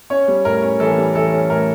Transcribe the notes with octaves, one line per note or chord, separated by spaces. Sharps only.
C#4 C#5
G3
A2 A#4
C#4
E3 A4
G3
E3 A4
C#4
A2 A#4